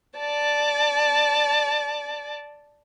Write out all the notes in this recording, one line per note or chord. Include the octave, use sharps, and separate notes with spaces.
D5 A5